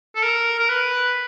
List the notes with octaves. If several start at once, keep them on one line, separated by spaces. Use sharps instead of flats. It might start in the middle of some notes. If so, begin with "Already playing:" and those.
A4
A#4
A#4
B4